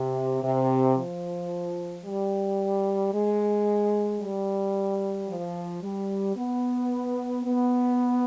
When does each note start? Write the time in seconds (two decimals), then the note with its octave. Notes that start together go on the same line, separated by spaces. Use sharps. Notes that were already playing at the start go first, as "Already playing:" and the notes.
Already playing: C3
0.43 C3
0.97 F3
2.05 G3
3.13 G#3
4.21 G3
5.28 F3
5.82 G3
6.36 B3
7.45 B3